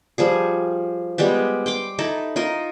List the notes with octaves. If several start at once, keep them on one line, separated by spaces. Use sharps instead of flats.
F3 G3 G#4
G3 G#3 B3 G4
G5 C6 D6
D#4 E4 A4
D#4 F4 A#4 D#5